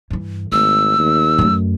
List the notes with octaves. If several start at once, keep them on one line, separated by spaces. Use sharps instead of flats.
G2 E3
G#1 A3 E6
D#2
F#2 A3